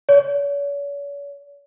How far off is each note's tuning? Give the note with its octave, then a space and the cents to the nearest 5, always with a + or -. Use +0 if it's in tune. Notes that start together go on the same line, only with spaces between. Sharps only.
C#5 +40